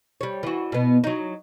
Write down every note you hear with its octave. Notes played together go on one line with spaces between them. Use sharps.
G3 C#5
E3 F#4
B2 B3
F#3 D#4